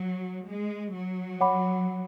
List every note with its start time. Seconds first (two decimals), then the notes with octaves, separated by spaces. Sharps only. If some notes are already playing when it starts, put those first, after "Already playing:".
Already playing: F#3
0.46 G#3
0.93 F#3
1.41 C#5 F#5 B5 D6